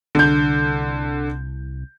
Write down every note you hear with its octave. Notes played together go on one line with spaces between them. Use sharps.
C2 D3 G6